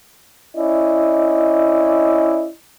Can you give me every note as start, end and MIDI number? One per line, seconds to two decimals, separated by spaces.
0.56 2.47 61
0.56 2.47 64
0.56 2.47 74
0.56 2.47 75